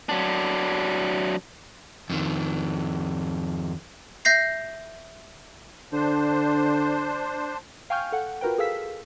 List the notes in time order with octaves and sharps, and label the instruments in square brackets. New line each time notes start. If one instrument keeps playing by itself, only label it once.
[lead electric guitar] F#3 D4
[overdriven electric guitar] F2 D#3
[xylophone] E5 G6 A#6 C7
[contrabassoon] D3 [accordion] D4 C5
[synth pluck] F5 G5 G#5 C#6 F6 G6
A4 F#5
F4 F#4 A#4 B4 G5
G#4 A4 F5 E6 B6